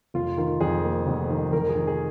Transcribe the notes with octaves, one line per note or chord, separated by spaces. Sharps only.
F1 F4
D#3 F4
F2 G#4
A#3
F1
D#3
F1 A#4
G#4
D#3
G#4